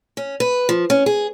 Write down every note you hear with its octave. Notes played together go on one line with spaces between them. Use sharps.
C#4
B4
F3
C#4
G#4